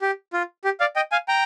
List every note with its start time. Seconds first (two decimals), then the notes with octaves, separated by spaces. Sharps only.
0.02 G4
0.33 F4
0.64 G4
0.80 D5 F5
0.96 D#5 G5
1.12 F5 G#5
1.28 G5 A#5